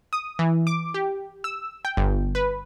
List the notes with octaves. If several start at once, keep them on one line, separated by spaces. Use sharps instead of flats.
D#6
E3
D6
G4
E6
G5
G1
B4